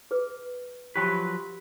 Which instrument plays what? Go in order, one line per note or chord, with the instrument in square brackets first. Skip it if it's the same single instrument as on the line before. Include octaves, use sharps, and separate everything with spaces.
[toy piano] G#4 B4
[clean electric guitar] F3 F#3 B4 [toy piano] G4 G5 B5